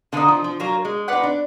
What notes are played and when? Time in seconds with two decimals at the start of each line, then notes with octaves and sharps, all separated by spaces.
0.12 D3 A#3 D#4 A#4 D#5
0.28 F3
0.44 F3
0.60 F#3 A#3 F4 A#4
0.85 G#3
1.08 D#4 F4 B4 D5 F#5
1.23 D4